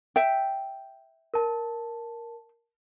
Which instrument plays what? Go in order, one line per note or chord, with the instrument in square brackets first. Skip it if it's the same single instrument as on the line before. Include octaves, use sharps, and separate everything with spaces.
[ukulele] E5 G5
[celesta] A#4 A5